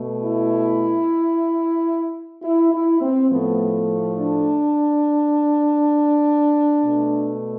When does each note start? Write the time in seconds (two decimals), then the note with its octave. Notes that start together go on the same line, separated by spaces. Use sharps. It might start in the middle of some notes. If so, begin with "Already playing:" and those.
Already playing: B2 A3
0.22 E4
2.42 E4
2.72 E4
3.01 C4
3.31 A2 F3 A3 B3
4.19 D4
6.83 B2 A3